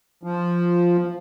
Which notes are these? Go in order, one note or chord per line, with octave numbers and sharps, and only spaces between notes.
F3